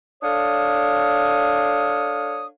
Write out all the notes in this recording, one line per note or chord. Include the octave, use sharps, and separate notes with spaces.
D4 A4 C#5 F5 D#6